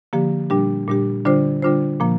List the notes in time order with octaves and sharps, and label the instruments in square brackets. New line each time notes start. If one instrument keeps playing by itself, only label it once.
[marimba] D3 F3 A#3 G4
A#2 G3 D4 G4
A#2 G3 D4 G4
D3 G3 D4 F4 C5
D3 G3 D4 F4 C5
A#2 F3 A#3